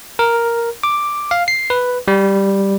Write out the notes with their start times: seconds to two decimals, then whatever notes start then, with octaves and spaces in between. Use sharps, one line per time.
0.19 A#4
0.83 D6
1.31 F5
1.48 C7
1.70 B4
2.08 G3